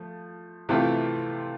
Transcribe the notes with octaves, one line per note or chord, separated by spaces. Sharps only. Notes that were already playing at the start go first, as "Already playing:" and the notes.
Already playing: F3 A3
C3 E3 A3 C4 F4